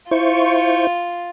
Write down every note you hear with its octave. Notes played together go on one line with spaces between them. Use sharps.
E4 F4 C5 C#6